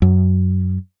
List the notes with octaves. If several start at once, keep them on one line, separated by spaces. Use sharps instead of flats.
F#2